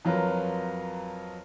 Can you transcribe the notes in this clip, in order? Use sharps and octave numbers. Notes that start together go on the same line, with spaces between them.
F2 F#3 F4 A#4 B4